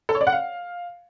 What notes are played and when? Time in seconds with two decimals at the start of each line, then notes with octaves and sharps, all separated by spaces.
0.09 A4
0.15 C#5
0.21 D5
0.27 F#5
0.33 F5